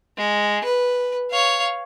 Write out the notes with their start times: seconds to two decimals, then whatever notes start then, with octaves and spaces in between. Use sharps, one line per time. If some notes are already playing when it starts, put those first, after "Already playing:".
0.18 G#3
0.64 B4
1.31 C#5 F5